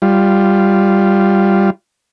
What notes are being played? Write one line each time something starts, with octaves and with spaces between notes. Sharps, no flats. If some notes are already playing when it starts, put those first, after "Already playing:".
G3 F4